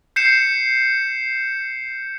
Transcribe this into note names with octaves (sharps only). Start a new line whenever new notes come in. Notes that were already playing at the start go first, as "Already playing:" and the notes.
G6 C7 C#7 E7